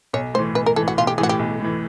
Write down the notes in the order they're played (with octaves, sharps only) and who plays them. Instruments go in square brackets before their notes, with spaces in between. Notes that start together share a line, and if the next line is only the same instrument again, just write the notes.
[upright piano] B1 [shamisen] C#5
[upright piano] A2 [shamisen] C5
[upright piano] E3
[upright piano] B1 [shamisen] B4
[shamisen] A#4
[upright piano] E3 [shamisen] A4
[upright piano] A2
[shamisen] F#4
[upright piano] B1 [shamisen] F4
[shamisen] G4
[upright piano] E3 [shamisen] G#4
[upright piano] A2 [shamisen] F#4
[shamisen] G4
[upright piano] B1
A2 E3